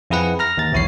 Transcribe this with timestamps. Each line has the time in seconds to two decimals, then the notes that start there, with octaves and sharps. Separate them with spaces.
0.10 F2 E4 G#4 B4 F#5
0.39 A#5 F6 A#6
0.57 D#2 A6
0.72 B1 E2 E4 C#5 C7